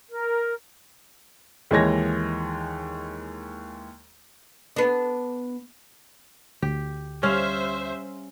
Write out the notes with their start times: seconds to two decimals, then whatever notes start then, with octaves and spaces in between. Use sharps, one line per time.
0.10 A#4
1.71 D#2 E3 G#3 C#5 G#6 A#6
4.76 B3 D4
6.62 D2 G4
7.23 G3 C#4 C5 E5 F5